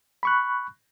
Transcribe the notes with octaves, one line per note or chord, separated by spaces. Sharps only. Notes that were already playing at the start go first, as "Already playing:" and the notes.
B5 C#6 F#6